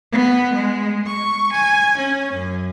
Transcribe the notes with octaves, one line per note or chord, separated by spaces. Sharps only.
B3
G#3
C#6
G#5
C#4
F#2